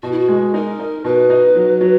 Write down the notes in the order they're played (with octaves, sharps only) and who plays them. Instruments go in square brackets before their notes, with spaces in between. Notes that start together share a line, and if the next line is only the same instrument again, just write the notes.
[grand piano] B2 [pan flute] F#4
[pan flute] E4
F#4
[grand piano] G#3
[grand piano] D#4 [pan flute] A#4
[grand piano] D#4
[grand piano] B2 [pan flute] B4
[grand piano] D#4
F#3
F#3